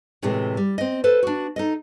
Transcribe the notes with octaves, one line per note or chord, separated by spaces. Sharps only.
A2 C3 E3 G#3
G3
C4 D#5
A4 B4 C5
D4 F#4
D#4 A4 D#5